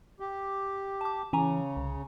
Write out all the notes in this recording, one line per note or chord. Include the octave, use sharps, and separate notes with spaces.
G4
A5 D6
C#3 E3 C#4 G#5 A#5
C2